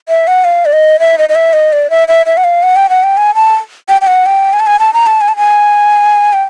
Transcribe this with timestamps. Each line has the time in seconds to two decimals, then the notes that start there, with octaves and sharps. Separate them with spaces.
0.09 E5
0.27 F#5
0.45 F5
0.66 D5
0.73 D#5
1.00 E5
1.18 D#5
1.29 D#5
1.35 E5
1.53 D#5
1.72 D5
1.90 E5
2.08 E5
2.26 E5
2.37 F#5
2.44 F5
2.63 F#5
2.76 G5
2.89 F#5
3.03 G5
3.17 G#5
3.35 A5
3.89 G5
4.01 G5
4.07 F#5
4.26 G5
4.53 G#5
4.60 A5
4.67 G#5
4.80 A5
4.93 A#5
5.07 A5
5.21 G#5
5.28 A5
5.37 G#5
6.33 G5